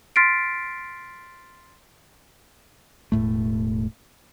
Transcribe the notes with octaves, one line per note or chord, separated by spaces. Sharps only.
C6 F6 A6 B6 C7 D7
E1 A2 A3